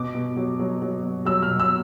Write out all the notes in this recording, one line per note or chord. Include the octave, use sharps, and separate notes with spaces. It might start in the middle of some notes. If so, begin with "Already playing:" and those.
Already playing: B2 D6
B2
F#3
F#3
F#3
B2
F#3 E6
F6
B2
E6